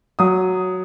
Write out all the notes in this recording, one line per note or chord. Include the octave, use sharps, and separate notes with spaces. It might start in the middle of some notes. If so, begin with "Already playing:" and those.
F#3 D#6